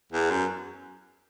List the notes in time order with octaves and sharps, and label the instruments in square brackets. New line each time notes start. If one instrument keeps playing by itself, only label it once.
[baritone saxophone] E2
F#2